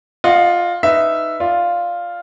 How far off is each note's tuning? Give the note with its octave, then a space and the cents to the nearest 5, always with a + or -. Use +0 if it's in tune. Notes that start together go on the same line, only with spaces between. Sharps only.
F4 +5 D#5 -25 F#5 -15
D#4 +0 B4 +15 E5 +0
F4 +0 D5 +0